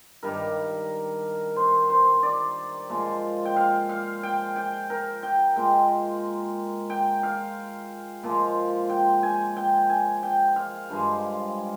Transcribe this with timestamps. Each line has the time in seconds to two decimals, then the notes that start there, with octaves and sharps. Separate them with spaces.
0.23 G2 D#3 G3 A#4
1.56 C5
1.90 C5
2.23 D5
2.90 A#2 F3 G#3
3.45 G5
3.56 F5
3.89 F5
4.23 G5
4.56 G5
4.90 A#4
5.23 G5
5.56 A#2 G#3 G5
6.90 G5
7.23 F5
8.23 A#2 F3 G#3
8.89 G5
9.23 G#5
9.57 G5
9.90 G#5
10.23 G5
10.56 F5
10.90 G2 F3 G#3